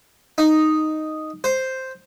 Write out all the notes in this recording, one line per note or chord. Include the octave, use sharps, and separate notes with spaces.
D#4
C5